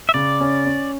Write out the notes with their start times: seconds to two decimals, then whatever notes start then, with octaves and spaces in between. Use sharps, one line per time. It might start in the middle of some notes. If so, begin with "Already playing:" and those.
0.09 E5
0.14 C#3 D5
0.40 C#4
0.66 C#4